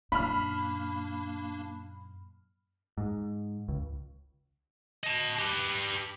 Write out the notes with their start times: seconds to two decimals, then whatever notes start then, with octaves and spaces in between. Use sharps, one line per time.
0.12 F#2 A#2 A#3 D4 B5 F6
2.98 G#2
3.68 C#2
5.04 D#5 A5
5.39 G4 B4